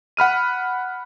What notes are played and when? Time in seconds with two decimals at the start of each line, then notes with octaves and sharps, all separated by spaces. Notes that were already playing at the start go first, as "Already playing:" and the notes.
0.17 F#5 B5 F6 D#7